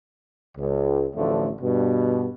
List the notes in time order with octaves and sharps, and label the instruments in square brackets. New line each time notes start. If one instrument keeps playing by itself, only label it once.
[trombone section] C#2
A1 D2 D3 F3 A3
G2 B2